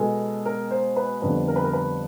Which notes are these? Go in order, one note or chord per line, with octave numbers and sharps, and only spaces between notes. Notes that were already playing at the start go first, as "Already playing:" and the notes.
Already playing: B2 G#3 B3 A4
A#4
C5
B4
F2 D3 G3 B3 B4
A#4
B4
A#4
B4